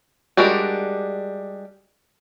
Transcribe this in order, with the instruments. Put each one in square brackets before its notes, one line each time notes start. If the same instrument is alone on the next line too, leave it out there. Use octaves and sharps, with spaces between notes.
[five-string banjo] G3 G#3 D4 F#4 A#4